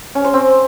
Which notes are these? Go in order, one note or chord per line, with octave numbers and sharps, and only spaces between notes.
C#4
C5
C4